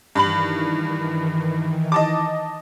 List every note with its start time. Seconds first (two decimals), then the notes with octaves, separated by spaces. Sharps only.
0.15 G2 D#3 E3 B5 F#7
1.92 D#5 A5 D6